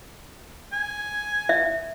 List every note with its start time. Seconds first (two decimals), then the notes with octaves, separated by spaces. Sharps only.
0.73 G#5
1.49 E5